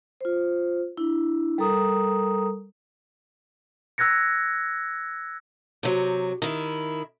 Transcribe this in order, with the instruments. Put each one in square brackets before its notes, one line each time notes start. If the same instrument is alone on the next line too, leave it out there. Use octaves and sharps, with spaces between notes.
[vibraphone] F4 C5
D4 E4
G3 A4 A#4 A#5 D#6
[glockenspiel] E6 F#6 G#6 A#6 C#7
[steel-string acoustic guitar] C3 F#3
D#3 E4